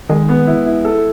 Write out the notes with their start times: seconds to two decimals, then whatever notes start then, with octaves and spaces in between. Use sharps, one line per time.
0.09 D#3 G#3
0.29 B3
0.47 E4
0.65 E4
0.85 A4